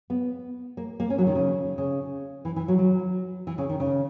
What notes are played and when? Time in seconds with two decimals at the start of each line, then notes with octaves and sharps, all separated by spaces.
0.10 B3
0.77 A#3
1.00 A#3
1.10 C#4
1.18 F#3
1.27 D#3
1.35 C#3
1.78 C#3
2.45 E3
2.56 E3
2.68 F#3
2.78 F#3
3.47 E3
3.58 C#3
3.69 D#3
3.80 C#3